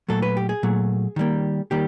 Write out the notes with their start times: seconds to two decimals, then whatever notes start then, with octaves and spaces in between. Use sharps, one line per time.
0.08 A#2 F#3 A3 A4
0.22 B4
0.37 G4
0.49 G#4
0.63 A#2 F#3 A3
1.16 D#3 G3 A#3
1.71 D#3 G3 A#3 G4